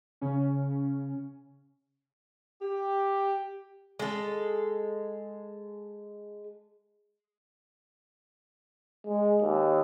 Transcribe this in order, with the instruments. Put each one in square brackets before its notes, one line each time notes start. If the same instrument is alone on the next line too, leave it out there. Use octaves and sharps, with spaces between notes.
[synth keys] C#3 C#4
[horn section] G4
[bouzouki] G#3 A4
[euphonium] G#3
D#2